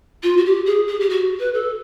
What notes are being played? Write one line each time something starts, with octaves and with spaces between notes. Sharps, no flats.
F4
F#4
G4
G#4
G#4
G4
F#4
B4
A4